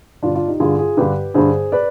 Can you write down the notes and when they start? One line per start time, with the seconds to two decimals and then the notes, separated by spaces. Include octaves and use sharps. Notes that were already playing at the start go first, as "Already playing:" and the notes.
0.23 G2 D3 D4 F4
0.35 D4 F4
0.48 D#4 G4
0.60 G2 D3 F4 G#4
0.79 F4 G#4
0.97 G2 D3 G4 B4
1.34 G2 D3 G#4 C5
1.72 B4 D5